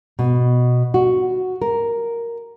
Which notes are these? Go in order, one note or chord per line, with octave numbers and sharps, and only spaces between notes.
B2
F#4
A#4